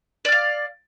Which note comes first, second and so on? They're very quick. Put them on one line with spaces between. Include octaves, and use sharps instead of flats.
D5 F6 F5